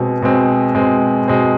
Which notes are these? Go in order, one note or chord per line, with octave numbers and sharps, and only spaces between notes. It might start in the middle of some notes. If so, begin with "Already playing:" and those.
Already playing: B2 G#3 C4
B2 G#3 C4
B2 G#3 C4
B2 G#3 C4